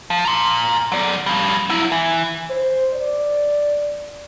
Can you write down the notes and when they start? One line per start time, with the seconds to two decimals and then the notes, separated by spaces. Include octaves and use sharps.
0.10 F3
0.25 A#5 C6
0.92 F#3 D5
1.26 F3 G3
1.69 F#3 E4
1.92 E3
2.50 C5
2.94 D5